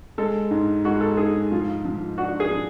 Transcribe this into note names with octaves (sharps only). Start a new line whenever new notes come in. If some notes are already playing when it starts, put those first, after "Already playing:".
G#3 A4
G#2
G#3 F#4
A4
G#2 G#4
F3 F4
F3
D4 F#4
G#4
F3